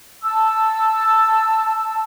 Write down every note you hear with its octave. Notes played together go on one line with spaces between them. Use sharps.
A5 E6